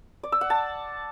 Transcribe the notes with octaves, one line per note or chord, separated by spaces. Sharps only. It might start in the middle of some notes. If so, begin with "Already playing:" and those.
D5
E6
F#5
A5